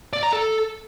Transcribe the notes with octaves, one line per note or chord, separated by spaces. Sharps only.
D5
A#5
A4